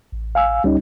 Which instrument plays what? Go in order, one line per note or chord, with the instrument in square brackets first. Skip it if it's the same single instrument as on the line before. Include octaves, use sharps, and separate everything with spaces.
[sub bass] A1
[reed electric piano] F5 G#5 E6
[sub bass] C#2 [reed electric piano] G3 C#4 D#4